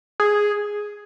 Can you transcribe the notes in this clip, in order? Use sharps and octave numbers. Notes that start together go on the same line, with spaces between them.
G#4